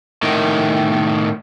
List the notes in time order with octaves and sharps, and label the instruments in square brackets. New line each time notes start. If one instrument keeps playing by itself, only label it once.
[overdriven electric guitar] A2 D#3